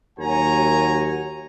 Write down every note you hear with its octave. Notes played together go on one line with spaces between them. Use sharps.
D#2 F#3 C#5 F#5 G#5 A#5